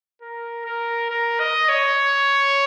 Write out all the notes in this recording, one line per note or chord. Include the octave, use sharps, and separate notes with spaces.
A#4
A#4
A#4
D#5
C#5